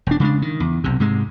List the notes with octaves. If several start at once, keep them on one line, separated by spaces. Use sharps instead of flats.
E1 D4
C#3 G3 G#3 D4
D#3
E2
B1 C3
G#2 C3 G#3